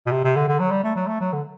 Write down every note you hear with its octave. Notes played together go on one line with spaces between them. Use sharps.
B2
C3
C3
D3
D3
F#3
G3
A3
F#3
A3
F#3
D3